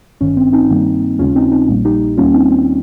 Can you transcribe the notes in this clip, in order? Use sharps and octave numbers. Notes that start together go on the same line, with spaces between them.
G#1 G2 D#3 C#4
C4
C4 D#4
G2 D#3 G3 A#3
D#2 C#3 G#3 C#4 F4
C4 D#4
C4 D#4
A#1 A#2 G3 A#3
D#4 G4
D#2 D#3 G3 A#3 C#4 F4
C4 D#4
C4